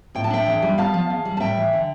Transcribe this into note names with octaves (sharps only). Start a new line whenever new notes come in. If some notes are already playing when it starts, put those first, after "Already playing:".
A2 G5
A5
D4 E5 G5
E2
G3
B3 F5 A5
F3
E2
G3
A5
A2 E5 G5
E3
D3